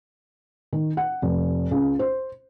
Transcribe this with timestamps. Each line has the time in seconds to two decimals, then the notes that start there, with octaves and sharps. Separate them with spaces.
0.73 D#3
0.97 F#5
1.22 F1
1.71 C#2
1.99 C5